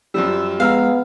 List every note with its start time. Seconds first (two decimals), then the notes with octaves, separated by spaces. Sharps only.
0.14 F#2 F3 G3 E6
0.60 G#3 B3 F5 A#5 E6 F6